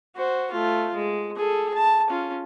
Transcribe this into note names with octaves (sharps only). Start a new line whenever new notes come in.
F#4 C5
A3 F4
G#3
G#4 A4
A5
C#4 F4